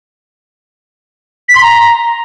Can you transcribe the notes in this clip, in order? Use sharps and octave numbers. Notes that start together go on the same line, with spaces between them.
B6
C6
A#5